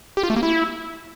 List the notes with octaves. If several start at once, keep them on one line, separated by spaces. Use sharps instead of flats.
G4
F4
A3
A#3
E4